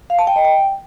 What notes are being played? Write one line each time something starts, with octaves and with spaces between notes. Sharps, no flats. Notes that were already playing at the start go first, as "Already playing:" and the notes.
F5
A5
G5
D#5
G5